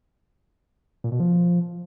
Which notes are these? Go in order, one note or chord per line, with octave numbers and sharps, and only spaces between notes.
A#2
B2
F3